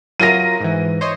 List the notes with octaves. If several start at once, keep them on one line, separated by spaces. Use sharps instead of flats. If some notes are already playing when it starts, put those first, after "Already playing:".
F#3 F4 A#4 A#6 D#7
G#2 E3
C5 C#5 D#5